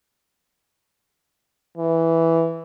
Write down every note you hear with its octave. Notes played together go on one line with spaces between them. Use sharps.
E3